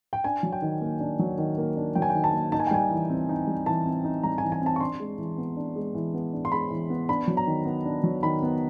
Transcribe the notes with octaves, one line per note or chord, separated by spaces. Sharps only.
G5
D4 G#5
F#3
G5
D#3
A#3
D4
F#3
D#3
A#3
D4
F#3 G5
G#5
G5
D#3
A5
A#3
D#4 A5
G#5
G5
G3 G#5
E3
C4
D#4
G3
E3 A5
C4
D#4
G3 A#5
G#5
E3
G#5
C4 A5
C#6
D4 C6
G#3
E3
B3
D4
G#3
E3
B3
D4
C6
G#3 B5
E3
B3
D4 B5
F#3
A#5
D#3
B3
D4
F#3
D#3 B5
B3